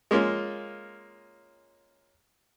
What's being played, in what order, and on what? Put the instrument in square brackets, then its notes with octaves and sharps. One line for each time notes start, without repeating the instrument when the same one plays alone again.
[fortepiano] G#3 A#3 C#4 F4